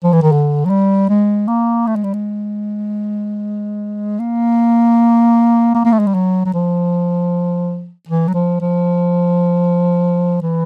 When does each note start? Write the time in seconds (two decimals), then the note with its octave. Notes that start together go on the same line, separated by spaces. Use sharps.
0.04 F3
0.13 E3
0.22 D#3
0.32 D3
0.65 F#3
0.70 G3
1.09 G#3
1.48 A#3
1.87 A3
1.96 G#3
2.04 G3
2.14 G#3
4.20 A#3
5.75 A#3
5.85 A#3
5.92 A3
5.99 G#3
6.07 G3
6.14 F#3
6.45 F#3
6.54 F3
8.09 E3
8.28 F#3
8.34 F3
8.61 F3
10.42 E3